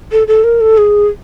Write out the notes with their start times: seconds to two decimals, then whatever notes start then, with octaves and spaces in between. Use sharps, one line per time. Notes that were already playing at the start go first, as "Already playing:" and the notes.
0.12 A4
0.28 A4
0.44 A#4
0.61 A4
0.78 G#4